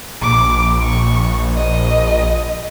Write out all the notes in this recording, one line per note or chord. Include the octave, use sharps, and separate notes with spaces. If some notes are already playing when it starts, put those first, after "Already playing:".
A#1 D6
C#6
D#5